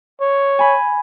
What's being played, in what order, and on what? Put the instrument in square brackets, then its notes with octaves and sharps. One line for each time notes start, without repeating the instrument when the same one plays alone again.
[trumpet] C#5
[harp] G#5 B5